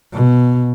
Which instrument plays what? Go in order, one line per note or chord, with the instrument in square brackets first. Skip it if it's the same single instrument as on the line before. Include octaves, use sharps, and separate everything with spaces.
[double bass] B2